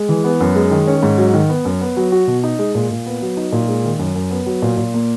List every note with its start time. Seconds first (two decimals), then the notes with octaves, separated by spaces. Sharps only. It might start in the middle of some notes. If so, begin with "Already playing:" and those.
Already playing: G#3
0.09 E3
0.24 B3
0.40 F#2
0.55 G#3
0.71 D#3
0.87 C#4
1.03 G#2
1.18 F#3
1.34 D#3
1.49 B3
1.65 F#2
1.81 B3
1.97 F#3
2.12 F#4
2.27 B2
2.44 D#4
2.59 G#3
2.75 A#2
2.91 A#2
3.06 B3
3.22 F#3
3.37 D#4
3.52 A#2
3.68 G#3
3.85 D#3
3.99 F#2
4.15 F#2
4.31 B3
4.46 F#3
4.62 A#2
4.77 A#2
4.94 A#3